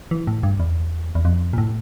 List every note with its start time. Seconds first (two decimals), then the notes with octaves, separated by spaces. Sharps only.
0.11 E3
0.27 A2
0.43 G2
0.60 E2
1.15 E2
1.25 F2
1.53 A#2
1.58 A2